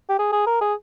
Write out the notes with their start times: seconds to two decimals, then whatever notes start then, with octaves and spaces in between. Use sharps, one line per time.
0.09 G4
0.19 G#4
0.33 G#4
0.47 A#4
0.61 G#4